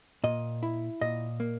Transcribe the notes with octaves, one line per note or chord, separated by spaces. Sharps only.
A#2 D#5
E4
A#2 D#5
A#3